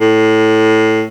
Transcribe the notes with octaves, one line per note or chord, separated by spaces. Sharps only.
A2